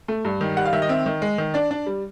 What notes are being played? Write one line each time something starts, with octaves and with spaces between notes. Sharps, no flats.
A3
G2
D#3
G3 F#5
F5
D#3 E5
D#5
C4 E5
D#3
G#3
D#3
D4 D5
D4
G3